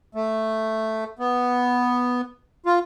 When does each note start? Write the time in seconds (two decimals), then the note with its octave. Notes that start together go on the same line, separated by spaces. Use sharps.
0.15 A3
1.19 B3
2.66 F4